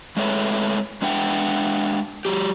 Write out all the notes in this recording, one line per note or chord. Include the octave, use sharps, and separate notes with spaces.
G#3 A3 C4 B4 C#5 E5
G#3 D4 B4 E5 F#5 G5
F#3 G4